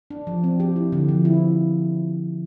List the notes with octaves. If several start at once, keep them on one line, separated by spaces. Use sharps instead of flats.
D4
F3
C4
G4
E4
D3
F3
E4